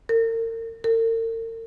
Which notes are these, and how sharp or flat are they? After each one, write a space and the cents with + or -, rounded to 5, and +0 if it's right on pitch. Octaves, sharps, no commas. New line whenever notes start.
A#4 -40
A#4 -45